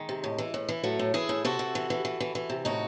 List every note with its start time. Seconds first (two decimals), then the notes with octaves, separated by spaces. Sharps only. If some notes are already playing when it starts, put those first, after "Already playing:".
Already playing: D#3 G#3
0.09 C3
0.24 A2
0.38 E3
0.54 A2
0.69 E3
0.84 A2 F#3 A3
0.99 A2
1.14 E3 E4 G#4
1.29 A2
1.45 C3 F#4 A4
1.59 C3
1.75 E3
1.90 E3
2.05 E3
2.20 E3
2.35 E3
2.50 C3
2.65 A2 D#4 F#4